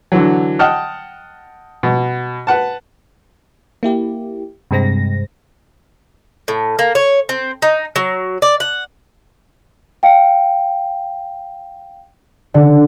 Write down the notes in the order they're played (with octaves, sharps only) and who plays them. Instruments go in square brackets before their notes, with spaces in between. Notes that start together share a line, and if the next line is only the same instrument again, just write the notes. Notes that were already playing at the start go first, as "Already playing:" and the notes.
[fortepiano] D3 E3 F#3
D#5 F#5 G5 A5 F6
B2
B4 F#5 A5
[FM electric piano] A#3 E4 G4
G2 C3 G#3 C4 A#6
[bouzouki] A2
A#3
C#5
C4
D#4
F#3
D5
F#5
[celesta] F5 G5
[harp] D3 [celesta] D5